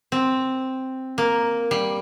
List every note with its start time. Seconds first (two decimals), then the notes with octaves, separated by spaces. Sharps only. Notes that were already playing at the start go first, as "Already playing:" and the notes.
0.12 C4
1.18 A#3
1.71 G3